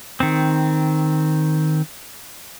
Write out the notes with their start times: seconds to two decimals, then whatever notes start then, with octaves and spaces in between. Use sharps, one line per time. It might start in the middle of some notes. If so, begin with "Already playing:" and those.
0.20 D#3 C4